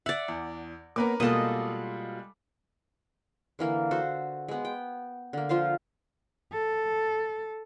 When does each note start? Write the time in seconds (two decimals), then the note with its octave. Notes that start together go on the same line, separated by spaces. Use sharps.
0.06 D5 E5 F#5
0.28 E2
0.96 A#3 B3 C#4 A#4 B4 D6
1.20 B2 G3 G#3 A#3 F4 A4 D#5 F5
3.59 D3 E3 A#3
3.91 F#4 A4 C5
4.48 G#3 B3
4.65 G5
5.33 D3 A#3
5.49 F3 F4 C5 F5
6.53 A4